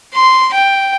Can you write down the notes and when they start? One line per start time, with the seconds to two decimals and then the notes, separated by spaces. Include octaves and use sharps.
0.14 C6
0.54 G5